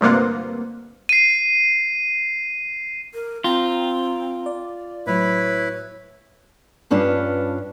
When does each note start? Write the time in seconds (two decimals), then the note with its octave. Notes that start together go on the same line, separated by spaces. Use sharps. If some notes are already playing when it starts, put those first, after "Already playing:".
0.01 D2 G2 C3 A#3 F4 F#5
1.09 C7 D#7
3.14 A#4
3.44 C4 F4 G5 A#5
4.46 D5
5.07 A2 F#3 E4 B4 C#5
6.91 G2 C#4 D4 F4 B4